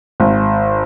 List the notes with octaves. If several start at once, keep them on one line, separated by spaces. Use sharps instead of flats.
G#1